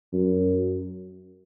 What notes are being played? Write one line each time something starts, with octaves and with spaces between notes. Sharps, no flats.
F#2